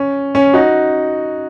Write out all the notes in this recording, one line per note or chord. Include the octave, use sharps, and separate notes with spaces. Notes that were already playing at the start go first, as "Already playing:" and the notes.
Already playing: C#4
C#4
D#4 F#4